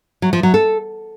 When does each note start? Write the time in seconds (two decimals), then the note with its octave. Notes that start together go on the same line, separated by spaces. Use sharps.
0.22 F#3
0.33 F3
0.43 F#3
0.54 A4